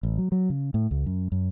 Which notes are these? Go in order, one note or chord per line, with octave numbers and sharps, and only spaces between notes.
A1
F#3
F#3
C#3
A2
C#2
F#2
F#2